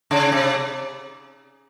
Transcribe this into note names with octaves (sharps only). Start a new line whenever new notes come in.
C#3
C3